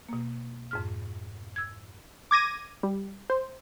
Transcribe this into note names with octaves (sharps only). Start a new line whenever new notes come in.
B2 A#3
F2 G#2 F6
E6 G#6
D6 G#6 A#6 D#7
G3
C5